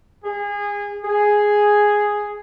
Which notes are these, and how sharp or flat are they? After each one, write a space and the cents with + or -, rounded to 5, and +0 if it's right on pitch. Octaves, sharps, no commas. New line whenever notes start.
G#4 -25
G#4 +0